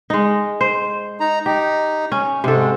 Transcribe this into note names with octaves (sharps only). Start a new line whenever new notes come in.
G#3 D#4
C5
D#4 A#5
D#4 G4
C#4
G#2 C3 A4